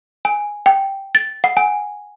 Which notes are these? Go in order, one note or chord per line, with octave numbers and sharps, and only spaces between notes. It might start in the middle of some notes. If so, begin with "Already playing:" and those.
G#5
G5
A6
F#5
G#5